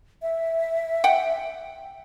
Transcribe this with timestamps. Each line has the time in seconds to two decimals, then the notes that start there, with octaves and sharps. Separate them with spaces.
0.22 E5
1.04 F#5 G5